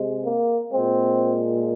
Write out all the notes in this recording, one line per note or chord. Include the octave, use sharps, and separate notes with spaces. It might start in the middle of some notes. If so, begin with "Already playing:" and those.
Already playing: C3 G#3
A#3
A#2 G#3 C4